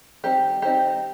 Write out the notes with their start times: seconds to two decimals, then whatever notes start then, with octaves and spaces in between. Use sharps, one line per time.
0.24 D#3 G3 C4 D#4 G4
0.62 D#3 G3 C4 D#4 G4